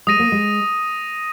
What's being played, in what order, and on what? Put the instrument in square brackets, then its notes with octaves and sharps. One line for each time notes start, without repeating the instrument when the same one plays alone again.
[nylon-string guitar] G#3 [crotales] D#6 A#6 D#7
[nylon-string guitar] A#3
G#3